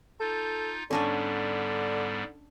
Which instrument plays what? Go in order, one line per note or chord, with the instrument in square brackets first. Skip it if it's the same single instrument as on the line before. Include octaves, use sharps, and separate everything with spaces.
[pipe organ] D#4 F4 G6 [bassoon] A4
[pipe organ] G#2 G3 B3 [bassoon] D3 [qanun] C#4 D4 G#5